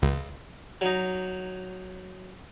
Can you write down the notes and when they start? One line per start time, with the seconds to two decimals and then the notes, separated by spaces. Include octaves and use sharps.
0.02 C#2
0.81 F#3 D#4